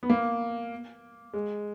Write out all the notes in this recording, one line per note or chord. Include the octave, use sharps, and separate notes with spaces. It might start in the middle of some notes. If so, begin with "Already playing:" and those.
B3
A#3
G#3